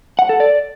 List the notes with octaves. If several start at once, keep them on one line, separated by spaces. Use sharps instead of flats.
F#5
A4
D5